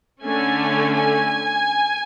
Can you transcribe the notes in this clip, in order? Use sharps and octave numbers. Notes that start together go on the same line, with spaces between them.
D3 A3 C#4 G#5
G#5